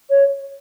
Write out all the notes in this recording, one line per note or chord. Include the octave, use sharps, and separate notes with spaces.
C#5